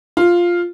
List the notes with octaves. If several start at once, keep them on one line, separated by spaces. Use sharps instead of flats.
F4